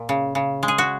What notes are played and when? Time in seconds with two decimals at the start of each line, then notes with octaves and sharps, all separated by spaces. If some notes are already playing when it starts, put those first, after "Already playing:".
Already playing: A#2
0.09 C#3
0.35 C#3
0.63 G#3
0.68 G#4
0.78 F#4